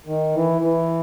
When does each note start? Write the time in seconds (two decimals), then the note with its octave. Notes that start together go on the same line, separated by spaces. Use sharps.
0.07 D#3
0.34 E3
0.62 E3